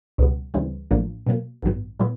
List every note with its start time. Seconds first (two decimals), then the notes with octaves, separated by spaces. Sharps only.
0.18 C#2 B2 G3 B3
0.54 D2 C#3 E3 G3 C4
0.91 A1 A2 F3 A#3 D4
1.26 B2 F#3 A#3
1.63 A1 G2 D#3 F#3 B3
1.99 A#2 F#3 B3 E4